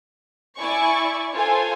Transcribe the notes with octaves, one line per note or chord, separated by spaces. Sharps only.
E4 D5 G#5 C#6
F4 A4 C5 G#5